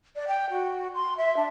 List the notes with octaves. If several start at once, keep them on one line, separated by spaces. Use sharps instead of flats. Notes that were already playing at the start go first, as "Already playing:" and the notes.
D5
G5
F#4
C6
E5
D4